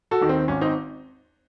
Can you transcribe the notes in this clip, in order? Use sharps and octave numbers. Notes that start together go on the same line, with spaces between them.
F#4 A4
D#2 D#3
C4
G#1 C#4
C4 D#4